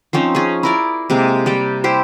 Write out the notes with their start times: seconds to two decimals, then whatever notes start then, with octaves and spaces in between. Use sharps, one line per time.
0.13 F3 C4 C#4 D#4
0.35 C#4 G#4
0.63 E4 A#4 D5
1.10 C3 G#3 A#3
1.46 G3 D5 G5
1.84 E4 G4 C5